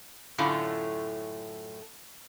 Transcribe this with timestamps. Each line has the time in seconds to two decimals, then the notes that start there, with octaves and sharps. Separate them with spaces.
0.38 F#2 A2 D3 A3 C#4 F4